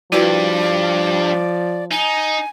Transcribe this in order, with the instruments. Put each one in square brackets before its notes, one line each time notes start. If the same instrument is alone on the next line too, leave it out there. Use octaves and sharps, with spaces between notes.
[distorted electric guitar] G2 [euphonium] F3 [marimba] E4 F#4 B4 [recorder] D5
[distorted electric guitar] D#4 [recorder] G#5